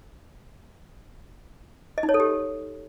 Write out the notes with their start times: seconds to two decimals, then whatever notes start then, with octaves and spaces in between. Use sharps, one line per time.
1.98 D#5
2.03 D#4
2.09 C#5
2.14 A4
2.20 G4